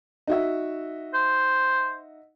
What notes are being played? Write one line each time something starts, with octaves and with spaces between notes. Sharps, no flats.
D#4 F#4 E5
C5